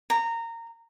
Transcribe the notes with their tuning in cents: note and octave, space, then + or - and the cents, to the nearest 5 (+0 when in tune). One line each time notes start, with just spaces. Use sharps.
A#5 -20